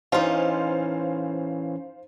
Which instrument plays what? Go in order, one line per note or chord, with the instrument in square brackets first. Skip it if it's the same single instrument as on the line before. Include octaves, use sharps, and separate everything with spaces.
[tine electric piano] E3 C#4 [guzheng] D#4 F4 [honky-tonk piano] C5 F5